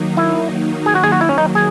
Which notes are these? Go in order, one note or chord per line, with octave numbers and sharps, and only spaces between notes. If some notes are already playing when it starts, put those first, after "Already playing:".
Already playing: D#3 F#3 A#3 D#4
E4
G#4
F#4
G#4
F#4
D#3 F#3 A#3 E4
C#4
D#4
G#4